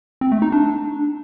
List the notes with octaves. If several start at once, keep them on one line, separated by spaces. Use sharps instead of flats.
C4
A3
D#4
D4